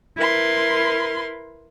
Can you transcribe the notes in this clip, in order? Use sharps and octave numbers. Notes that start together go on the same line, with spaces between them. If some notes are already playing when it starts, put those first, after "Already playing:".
E4 A#4 B4 C6